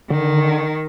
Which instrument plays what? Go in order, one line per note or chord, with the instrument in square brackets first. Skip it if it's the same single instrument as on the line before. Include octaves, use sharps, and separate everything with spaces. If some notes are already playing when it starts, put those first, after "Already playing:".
[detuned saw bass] D3 [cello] D#3